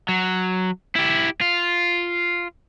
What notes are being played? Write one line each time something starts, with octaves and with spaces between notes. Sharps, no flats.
F#3
E4 G4
F4